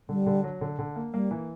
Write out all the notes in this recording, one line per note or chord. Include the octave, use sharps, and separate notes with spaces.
D3 G3
D3
F#3
D3
D3
A#3
G3 A#3
E3